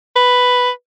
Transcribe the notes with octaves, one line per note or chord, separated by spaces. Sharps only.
B4